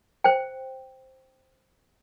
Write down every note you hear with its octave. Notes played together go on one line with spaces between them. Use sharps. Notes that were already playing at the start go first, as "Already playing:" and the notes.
C5 G5